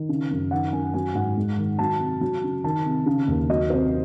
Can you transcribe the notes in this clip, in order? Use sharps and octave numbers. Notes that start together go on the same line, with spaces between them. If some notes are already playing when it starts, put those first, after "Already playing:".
Already playing: D#3
C#3
F#2
D#3 F#5
F#2 G#5
F#3 G#5
G#2 F#5
G#3
D#3
F#3 A5
C3
F#3
C#3
D#3 A5
C3
C#3
D#2
F#3 D#5
C3 C5